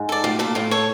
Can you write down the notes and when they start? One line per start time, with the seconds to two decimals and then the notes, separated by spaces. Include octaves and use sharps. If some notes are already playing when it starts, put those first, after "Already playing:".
Already playing: G#2
0.09 A4 D5
0.24 A2 F4
0.39 A#2 A4 D5
0.55 A2 F4
0.71 A4 C#5